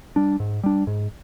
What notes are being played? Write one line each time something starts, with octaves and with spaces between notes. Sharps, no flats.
G3 D4
G#2
G3 D4
G#2